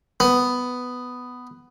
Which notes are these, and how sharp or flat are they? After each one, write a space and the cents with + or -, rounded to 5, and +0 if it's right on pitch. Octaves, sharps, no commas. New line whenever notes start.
B3 +10